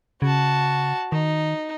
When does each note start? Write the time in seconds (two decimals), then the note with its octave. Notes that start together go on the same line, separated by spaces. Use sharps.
0.22 C#3 F#4 A5
1.12 D#3 D#4